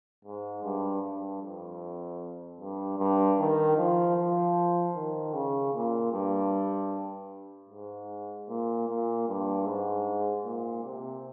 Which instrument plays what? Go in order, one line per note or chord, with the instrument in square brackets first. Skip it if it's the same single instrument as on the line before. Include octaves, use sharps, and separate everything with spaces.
[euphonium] G#2
G2
G2
F2
G2
G2
D#3
F3
F3
D#3
C#3
A#2
G2
G#2
A#2
A#2
G2
G#2
A#2
C3